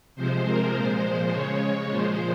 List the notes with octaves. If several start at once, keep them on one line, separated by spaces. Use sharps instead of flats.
C3 F3 G#3 C5
A#4
A#2 F3 G#3 C5
C#3 G#3 C#5
C#5
A#2 F3 G#3 C5